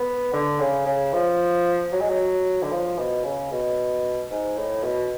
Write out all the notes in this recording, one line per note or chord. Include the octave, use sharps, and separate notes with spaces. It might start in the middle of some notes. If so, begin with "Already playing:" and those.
Already playing: B3
D3
C#3
C#3
F3
F#3
G#3
F#3
D3
F3
B2
C#3
B2
G#2
A2
B2